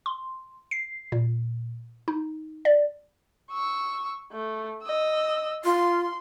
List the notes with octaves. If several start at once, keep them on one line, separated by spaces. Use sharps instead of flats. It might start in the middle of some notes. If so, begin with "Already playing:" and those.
C6
C7
A#2
D#4
D5
C#6 E6
A3
D#5 E6
F4 C6